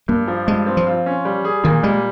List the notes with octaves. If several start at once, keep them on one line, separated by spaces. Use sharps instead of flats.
G2 A#3
F3
G2 G#3
C4
F3
F4
C#4
G3
G#4
A#2 D#3
G3 G#3